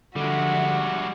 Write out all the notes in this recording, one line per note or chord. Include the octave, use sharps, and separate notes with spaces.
D3 F3 G3 G#3 D4 F#4 E5